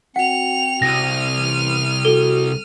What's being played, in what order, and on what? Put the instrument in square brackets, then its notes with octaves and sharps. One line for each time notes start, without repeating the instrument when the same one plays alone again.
[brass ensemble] C4 F#4 G5 [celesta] F#5 [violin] C#7 F7
[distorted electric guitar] C2 [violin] F6 D#7 [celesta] A#6
[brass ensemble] A1 E3
[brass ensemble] F#4 [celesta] A4 G7